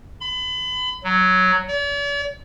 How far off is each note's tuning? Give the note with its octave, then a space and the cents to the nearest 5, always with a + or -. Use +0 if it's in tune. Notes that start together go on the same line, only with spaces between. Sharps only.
B5 +35
F#3 +5
D5 -45